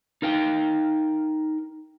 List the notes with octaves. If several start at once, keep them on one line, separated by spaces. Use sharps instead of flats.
D#4 A#4 F5 G5